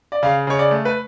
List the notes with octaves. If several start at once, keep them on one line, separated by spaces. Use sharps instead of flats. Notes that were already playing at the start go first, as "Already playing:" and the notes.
D5
C#3 F5
C#3 C#5
D5
A3
B4